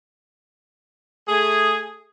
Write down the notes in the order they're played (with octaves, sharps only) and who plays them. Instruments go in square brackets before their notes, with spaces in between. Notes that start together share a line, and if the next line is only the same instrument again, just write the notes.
[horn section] A3 G#4